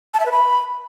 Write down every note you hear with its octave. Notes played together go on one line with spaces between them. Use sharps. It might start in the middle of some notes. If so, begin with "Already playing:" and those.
A5
E5
B4
B5